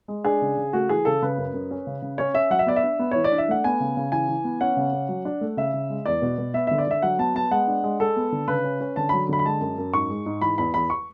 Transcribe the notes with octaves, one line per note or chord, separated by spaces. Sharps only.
G#3
D4 G#4
C#3
C#3
A3 F#4
E3 G#4
C#3 A4
C#3 B4
F#2
F#2
C#4
C#3
C#3
C#4 C#5
C#4 E5
F#3 F#5
E5
B3 D5
E5
D4
B3
E3 C#5
D5
D4
E5
A3 F#5
B3 G#5
C#3
C#3
E3 G#5
E3
B3
C#4 F#5
C#3
C#4
F#3
D4
A3
C#3 E5
C#3
G#3
E2 D5
B2
B2
B3 E5
D3 E5
D5
D3 E5
F#3 F#5
B3 A5
B3 A5
G#3 F#5
D4
G#3
G#3 A4
B3
D3
C#3 B4
C#4
C#4
D3 A5
F#3 B5
D3 B5
B5
G#3 A5
F#2
F#2
G#2 C#6
G#3
G#2
E3 B5
E2 B5
E2 B5
C#6